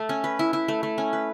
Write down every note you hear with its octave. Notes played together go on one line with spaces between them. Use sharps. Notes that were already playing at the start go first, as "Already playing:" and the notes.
Already playing: A3
C#4
B4
E4
E4
A3
A3
C#4
B4